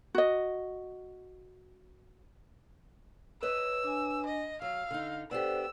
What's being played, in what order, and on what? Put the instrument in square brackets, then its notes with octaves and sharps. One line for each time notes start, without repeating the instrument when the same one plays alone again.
[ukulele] F#4 D#5
[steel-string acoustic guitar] B4 C#5 D#5 [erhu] E6
[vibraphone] D4 G#5
[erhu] D#5
[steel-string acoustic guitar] F#3 [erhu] F5 [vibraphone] E6
[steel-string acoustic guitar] D3 D#4
[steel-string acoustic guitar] B3 D4 G4 [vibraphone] A4 C5 D5 [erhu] E6